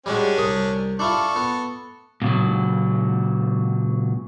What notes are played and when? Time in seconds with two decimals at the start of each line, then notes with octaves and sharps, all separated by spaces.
0.06 G3 G#3 C#4 D4 F#4
0.37 C2 D#6
0.99 D4 E4 F4 A4 C#6
1.36 B3
2.22 A#2 C#3 F#3